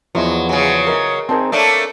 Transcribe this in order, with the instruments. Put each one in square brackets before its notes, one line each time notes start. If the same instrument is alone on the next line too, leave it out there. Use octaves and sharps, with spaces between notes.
[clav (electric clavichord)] E2 F3 [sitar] F#3 [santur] B3 E4 D#5
[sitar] C#3 F#3 [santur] G#4
[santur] A#4 D#5
[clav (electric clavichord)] C4 D#4 G#4 [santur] A#4 C5 A5
[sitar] A3 A#3 D4 [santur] C#5 [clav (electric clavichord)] E5